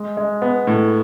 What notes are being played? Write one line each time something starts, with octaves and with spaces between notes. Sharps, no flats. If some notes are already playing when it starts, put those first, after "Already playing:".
Already playing: G#3
G#3
B3
A2